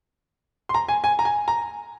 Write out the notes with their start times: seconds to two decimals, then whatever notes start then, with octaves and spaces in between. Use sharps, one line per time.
0.69 C6
0.74 A#5
0.88 G#5
1.04 G#5
1.19 A#5
1.25 G#5
1.48 A#5